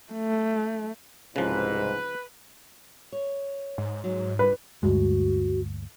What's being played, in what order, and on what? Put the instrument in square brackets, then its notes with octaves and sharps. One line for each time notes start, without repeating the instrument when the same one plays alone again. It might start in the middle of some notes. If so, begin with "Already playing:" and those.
[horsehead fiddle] A3
[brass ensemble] C2 G#2 [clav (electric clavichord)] C#3 F3 [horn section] B4
[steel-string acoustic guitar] C#5
[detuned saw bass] G#2
[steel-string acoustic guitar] F#3
[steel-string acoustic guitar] G2 [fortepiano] B4
[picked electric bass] D2 G2 G#3 [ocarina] F#4